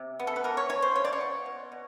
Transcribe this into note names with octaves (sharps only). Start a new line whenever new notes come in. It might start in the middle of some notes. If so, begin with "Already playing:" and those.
Already playing: C3
B3
A4
B4
E3 A#4
C#5
E3 C#5
C5
C#3 C#5
D5
C#5
B3
B2
B2